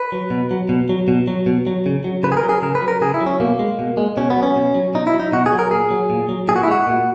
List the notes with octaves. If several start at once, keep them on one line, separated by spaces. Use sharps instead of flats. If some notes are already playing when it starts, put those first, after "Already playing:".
Already playing: B4
F#3
B2
F#3
B2
F#3
B2
F#3
B2
F#3
C#3
F#3
C#3 B4
G#4
A#4
F#3
G#4
C#3 A#4
B4
F#3
A#4
C#3 G#4
E4
F#3
C#4
B2 A#3
G#3
B2
G#3
B2 C#4
B3
F#3
C#4
B2
F#3
B2 D#4
E4
F#3
D#4
B2 F#4
G#4
F#3
A#4
A#2 G#4
F#3
A#2
F#3
A#2 G#4
F#4
E4
G#3 F#4
A#2